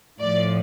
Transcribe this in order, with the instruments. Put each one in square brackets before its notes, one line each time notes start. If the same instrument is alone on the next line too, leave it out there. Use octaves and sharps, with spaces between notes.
[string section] A2 F3 D5